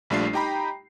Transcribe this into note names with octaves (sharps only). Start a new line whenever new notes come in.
A#1 G3 A3 D4 F4 C7
D#4 G4 G5 A#5 B5